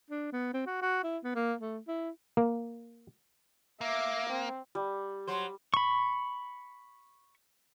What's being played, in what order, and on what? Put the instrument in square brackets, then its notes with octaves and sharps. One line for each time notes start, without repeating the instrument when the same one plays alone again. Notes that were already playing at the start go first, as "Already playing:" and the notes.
[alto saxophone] D4
B3
C4
F#4
F#4
E4
B3
A#3
A3
E4
[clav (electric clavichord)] A#3
[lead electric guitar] A#3 [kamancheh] E5 D6
[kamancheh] C4
[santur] G3
[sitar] F#3 C5
[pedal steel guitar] B5 C#6